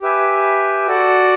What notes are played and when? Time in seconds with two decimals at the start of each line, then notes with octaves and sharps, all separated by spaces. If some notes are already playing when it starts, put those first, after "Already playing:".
0.02 G4 B4 E5 G#5
0.87 F#4 A4 D5 F#5